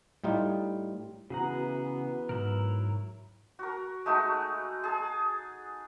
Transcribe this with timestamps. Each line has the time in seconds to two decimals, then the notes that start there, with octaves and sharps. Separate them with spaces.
0.24 A2 G3 D#4 F4
1.30 C#3 E3 B3 F#4 G#4 F#5 A#5
2.29 G#2 F#3 E4 A#4
3.59 F#4 A#4
4.06 G#3 A3 D#4 F#4
4.84 G#4 A5